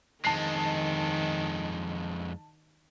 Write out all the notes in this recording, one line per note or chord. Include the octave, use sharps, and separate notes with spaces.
F2 D#3 G#3 A5 C7